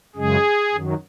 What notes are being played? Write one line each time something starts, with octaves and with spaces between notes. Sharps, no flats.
F#2 C#3 G#3 G#4
F#2 D#3 F#3